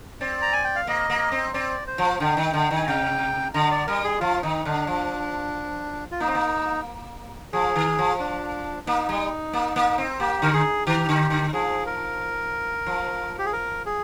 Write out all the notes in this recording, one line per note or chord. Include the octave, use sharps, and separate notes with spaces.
C4 D5
A#5
G#5
G5
F5
A#3 D#5
A#3
C4
C4 D5
C5
F3
D3 G5
D#3
D3
D#3
G#5
C3 G5
D3 A#5
D5
G3 A#4
G#4
F3 F4
D#3 D#4
D3 D4
F3
F4
A#3 D#4
C4
A#3
F3 G#4
D#3
F3
D4
A#3 D#4
G3
A#3
A#3
C4
A#3 G4
D3 A#4
G#4
D#3 G4
D3
D3
F3 G#4
A#4
F3
G4
G#4
A#4
G#4